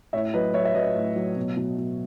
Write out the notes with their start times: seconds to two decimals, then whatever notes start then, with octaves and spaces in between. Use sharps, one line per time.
0.13 A2 C#5 E5
0.34 F#3 B4 D#5
0.54 F#3 C#5 E5
0.65 E5
0.75 F#3 B4 D#5
0.96 A2
1.16 F#3
1.37 B2
1.57 B2
1.78 B2